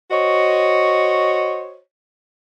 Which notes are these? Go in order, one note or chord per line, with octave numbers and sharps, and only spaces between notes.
F#4 C5 C#5 D#5